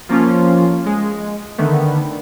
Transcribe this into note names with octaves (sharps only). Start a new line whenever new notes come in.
F3 A#3 C#4 F4
G#3
D3 D#3 A3 B3